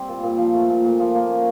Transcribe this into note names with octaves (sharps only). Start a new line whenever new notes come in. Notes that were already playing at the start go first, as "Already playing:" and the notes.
Already playing: G3 C4
A#2
A#2
F3
A3
A#2
A#2
F3
A#3
C#4